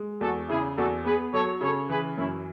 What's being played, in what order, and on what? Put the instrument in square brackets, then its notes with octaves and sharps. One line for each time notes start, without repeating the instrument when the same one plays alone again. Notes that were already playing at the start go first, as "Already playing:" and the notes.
Already playing: [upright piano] G#3
[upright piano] E2 [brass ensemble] F#4 A4
[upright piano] C#3 [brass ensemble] E4 G#4
[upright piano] E2 [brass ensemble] F#4 A4
[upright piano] B3 [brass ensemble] G#4 B4
[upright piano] F#3 [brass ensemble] A4 C#5
[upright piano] C#3 [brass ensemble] A4 C#5
[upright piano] E3 [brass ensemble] G#4 B4
[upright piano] F#2 [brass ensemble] C#4 E4